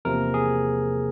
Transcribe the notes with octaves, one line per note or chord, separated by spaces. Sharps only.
E2 C3 F3 A#3 A#4
G#4